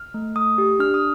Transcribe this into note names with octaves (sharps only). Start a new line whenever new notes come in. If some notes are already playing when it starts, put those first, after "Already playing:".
Already playing: F6
A3
A3 D#6
G4
D4 F6
D#6